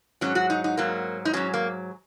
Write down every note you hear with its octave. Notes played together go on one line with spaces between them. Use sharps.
G#2 F#3 C#4
F#4
D#4
D#4
G#2 F#3 A#3
D#4
G#2 F#3 C#4
A#3